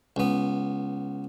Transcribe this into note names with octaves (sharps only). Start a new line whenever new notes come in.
C#2 B3